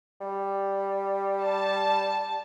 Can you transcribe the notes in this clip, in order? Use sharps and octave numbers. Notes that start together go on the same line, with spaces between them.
G3
A5